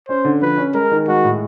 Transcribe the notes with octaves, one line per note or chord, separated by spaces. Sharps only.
C#4 C5
D3
F3 B4
C#4
G#3 A#4
D#3
G#3 F#4
A2